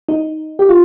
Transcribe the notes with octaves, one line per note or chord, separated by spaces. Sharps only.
D#4
G4
F4